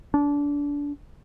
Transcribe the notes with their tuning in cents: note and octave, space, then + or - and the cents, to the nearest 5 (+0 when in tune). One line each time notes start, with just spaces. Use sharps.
D4 -25